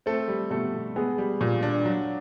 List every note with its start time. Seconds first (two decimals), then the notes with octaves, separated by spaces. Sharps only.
0.06 A3 C4 A4
0.28 G3
0.50 B2 A3 A4
0.74 B2
0.96 G#3 B3 G#4
1.18 G3
1.41 A#2
1.63 D4
1.85 F#3